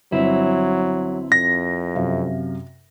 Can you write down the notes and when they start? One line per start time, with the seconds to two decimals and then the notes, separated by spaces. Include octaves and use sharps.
0.12 G1 F#3 C4 E4
1.32 F2 A#6
1.95 F#2 C3 F5